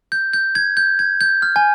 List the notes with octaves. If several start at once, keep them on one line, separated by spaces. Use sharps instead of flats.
G6
G6
G#6
G6
G#6
G6
F6
G#5